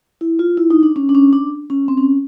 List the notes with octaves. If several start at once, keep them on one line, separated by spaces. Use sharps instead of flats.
E4
F4
E4
D#4
D4
C#4
D4
C#4
D4
C#4
C4
C#4